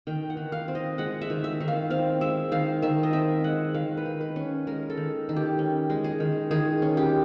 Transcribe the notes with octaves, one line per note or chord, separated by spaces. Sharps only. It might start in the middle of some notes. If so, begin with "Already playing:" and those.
D#3 G5
F#5
D#3
F5
C4
D#5
G#3 F#5
E5
D#3
E5
D#3
F5
C4 F5
G#3 E5
D#3 F5
D#3 E5
D#5
C4 E5
G#3 F#5
D#3 F5
B4
D#3
B4
C#4
G#3 A#4
A4
D#3
D#3
G4
C#4
G#3
G#4
D#3
D#3 G#4
C#4
G4